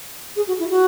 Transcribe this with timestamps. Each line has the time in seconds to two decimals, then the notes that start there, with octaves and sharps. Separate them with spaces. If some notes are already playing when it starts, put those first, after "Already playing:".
0.35 G#4
0.47 F#4
0.59 E4
0.70 F#4